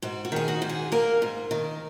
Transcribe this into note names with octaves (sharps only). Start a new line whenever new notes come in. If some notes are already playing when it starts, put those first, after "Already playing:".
G#2 F#4
F#4
D#3 G#4
F#4
G#2
G#4
A#3 A#4
G#2
D#3